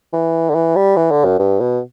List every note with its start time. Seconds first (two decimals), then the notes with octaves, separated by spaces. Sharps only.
0.13 E3
0.50 D3
0.55 E3
0.76 G3
0.97 E3
1.11 D3
1.25 F#2
1.39 G2
1.60 B2